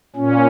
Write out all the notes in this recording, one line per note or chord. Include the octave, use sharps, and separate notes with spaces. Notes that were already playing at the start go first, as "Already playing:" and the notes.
A#2 C#4